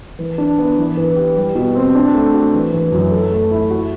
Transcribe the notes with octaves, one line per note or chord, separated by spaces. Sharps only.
E3
D4
B3
E3
E3
G4
G3
B2
C4
D4
A3
F#4
E3
E3
F#2
A4
A3
E4
F#4